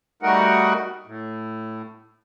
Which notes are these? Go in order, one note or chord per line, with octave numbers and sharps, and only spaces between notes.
G3 A3 D#4 F#4 A#4 F#5
A2